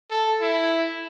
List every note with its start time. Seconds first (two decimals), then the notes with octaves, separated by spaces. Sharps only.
0.11 A4
0.41 E4